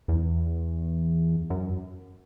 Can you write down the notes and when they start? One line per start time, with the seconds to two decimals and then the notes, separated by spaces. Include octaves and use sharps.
0.08 E2
1.50 F#2